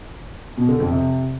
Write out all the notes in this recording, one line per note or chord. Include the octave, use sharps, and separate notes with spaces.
B2
D3
F2
C3